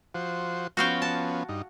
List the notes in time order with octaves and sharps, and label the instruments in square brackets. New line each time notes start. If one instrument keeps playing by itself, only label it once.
[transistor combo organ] F3 F#4 C5
[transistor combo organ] F3 B3 C#4 [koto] F#4 F5 G5
[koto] A5
[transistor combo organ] G2 D#4